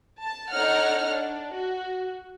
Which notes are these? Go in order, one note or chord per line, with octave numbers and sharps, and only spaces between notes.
A5
D4 D#4 A4 C#5 F#5 F6
D4
F#4